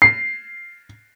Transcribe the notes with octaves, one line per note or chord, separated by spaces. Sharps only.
C7